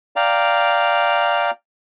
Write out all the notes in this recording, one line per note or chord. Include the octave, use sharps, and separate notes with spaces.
D5 F5 G5 A#5